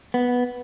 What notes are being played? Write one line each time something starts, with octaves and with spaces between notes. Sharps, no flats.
B3